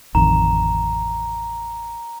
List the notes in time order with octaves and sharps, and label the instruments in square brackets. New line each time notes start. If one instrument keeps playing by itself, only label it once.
[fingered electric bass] A1 F2 D#3 [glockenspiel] A#5